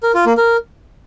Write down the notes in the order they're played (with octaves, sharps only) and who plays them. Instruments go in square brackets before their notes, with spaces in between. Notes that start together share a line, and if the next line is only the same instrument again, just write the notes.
[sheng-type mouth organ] A#4
F4
A#3
A#4